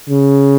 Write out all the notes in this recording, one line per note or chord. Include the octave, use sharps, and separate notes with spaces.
C#3